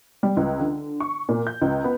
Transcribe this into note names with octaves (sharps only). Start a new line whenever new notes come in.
G3
C#2
D3
C#6
A#2
G6
C#2
B3